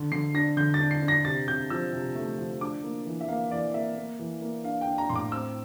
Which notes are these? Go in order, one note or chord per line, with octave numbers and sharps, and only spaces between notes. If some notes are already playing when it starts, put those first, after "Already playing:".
Already playing: D3
D3 C7
D4 A#6
D3 G6
A6
D4
C7
D4
A#6
C3 A6
C3 G6
F3 E6
C3
A3
F3
D4 D6
A#3
E3
E5
A#3 F5
E3 D5
A#3 E5
A#3
E3
A#3
D4 F5
G5
D4
A#5
A2 C6
D6
C4 E6